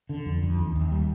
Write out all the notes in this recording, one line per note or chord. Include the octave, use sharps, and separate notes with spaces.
D3
F2
F2
D#2
D#2
G3